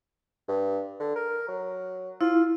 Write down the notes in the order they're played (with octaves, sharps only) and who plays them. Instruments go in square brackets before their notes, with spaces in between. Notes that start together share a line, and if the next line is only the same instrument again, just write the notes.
[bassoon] G2
D3
A#4
F#3
[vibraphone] E4 [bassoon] F4